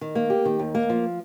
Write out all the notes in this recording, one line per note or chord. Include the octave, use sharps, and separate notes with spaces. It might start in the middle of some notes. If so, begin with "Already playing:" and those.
D#3
A#3
G4
D#3
D#2
A#3
F3